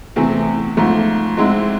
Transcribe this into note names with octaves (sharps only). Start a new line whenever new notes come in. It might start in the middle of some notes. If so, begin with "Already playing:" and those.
E2 C3 E3 A3 C4
G#2 F3 A3
G#2 G#3 C4 E4